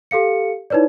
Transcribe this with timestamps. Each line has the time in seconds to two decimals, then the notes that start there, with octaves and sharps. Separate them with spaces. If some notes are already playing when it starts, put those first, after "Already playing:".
0.11 G4 A4 F5 C#7
0.70 D#4 E4 B4 C#5 D5